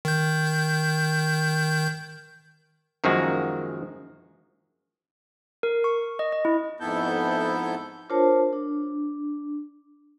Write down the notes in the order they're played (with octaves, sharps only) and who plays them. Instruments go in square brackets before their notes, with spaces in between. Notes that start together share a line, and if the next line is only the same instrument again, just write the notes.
[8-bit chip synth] D#3 G6
[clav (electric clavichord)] F#2 D#3 F3 G#3 A#3 F#4
[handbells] A#4
C#6
D#5
D#5
E4
[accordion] F2 G#2 B3 E4 A4 G6
[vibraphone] D4 F4 A#4 C5 C#5 A5
D4